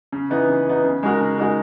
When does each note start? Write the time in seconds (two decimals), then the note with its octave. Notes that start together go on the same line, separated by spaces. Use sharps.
0.12 C#3
0.30 E3 B3 D#4
0.49 C#3
0.66 E3 B3 D#4
0.84 C#3
1.03 G#3 D#4 F#4 A#4
1.21 C#3
1.38 G#3 D#4 F#4 A#4